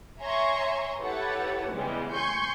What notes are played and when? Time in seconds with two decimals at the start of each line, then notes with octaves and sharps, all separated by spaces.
0.20 C#5 E5 G#5 A#5 C6 C#6
1.01 E4 G4 A4 B4 C#5 F#5
1.74 C#3 E3 G3 G#3 B3
2.12 G#5 C6 C#6 G6